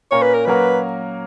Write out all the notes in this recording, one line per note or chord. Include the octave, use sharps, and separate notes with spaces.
A#2 A#3 C#4 C#5
B4
A#4
F#3 A#3 C#4 F#4 A#4 B4